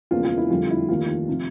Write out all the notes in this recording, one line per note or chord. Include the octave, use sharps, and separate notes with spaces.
E1 E2 C#3 F3 A#3 F4
F4
E4
F1 F2 D3 G3 F4
E4
F1 D#2 D#3 F4
C3 F3